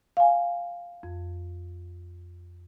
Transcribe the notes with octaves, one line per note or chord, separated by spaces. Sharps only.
F5 G#5
F2